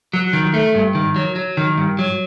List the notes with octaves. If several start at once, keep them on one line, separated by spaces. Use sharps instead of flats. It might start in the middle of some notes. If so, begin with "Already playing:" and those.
F#3
D#3
A3
G2
D#3
F#3
F#3
D#3
G2
F#3